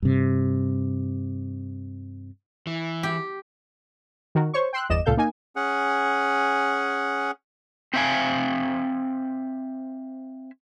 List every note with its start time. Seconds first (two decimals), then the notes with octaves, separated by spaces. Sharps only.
0.02 G2 C3
2.67 E3
3.03 G4
4.35 D#3 F#4 A#4
4.54 C5 C#5 C#6
4.73 G5 C6 E6 F#6
4.89 G1 E2 D5 D#5 E7
5.06 C#2 A#2 A4 F5 G6
5.17 A#3 D#4 G#5
5.56 C#4 G#4 F#5
7.94 C4 C5 E5 F5 G#5